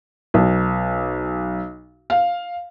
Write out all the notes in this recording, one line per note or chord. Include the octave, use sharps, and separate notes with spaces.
B1
F5